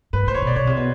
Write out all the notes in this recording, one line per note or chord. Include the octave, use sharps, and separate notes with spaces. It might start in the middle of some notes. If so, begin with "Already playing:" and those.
G#2 B4
A2 C5
C#5
B2
D5
B2 C#5
C3
B2